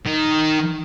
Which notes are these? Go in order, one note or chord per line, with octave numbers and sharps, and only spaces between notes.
D#3